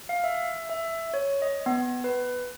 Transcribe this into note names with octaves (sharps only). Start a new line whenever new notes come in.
F5
E5
E5
C#5
D#5
B3
B4